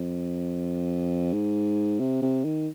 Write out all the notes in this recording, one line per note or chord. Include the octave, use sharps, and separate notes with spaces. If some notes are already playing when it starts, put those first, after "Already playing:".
Already playing: F2
G#2
C3
C3
D#3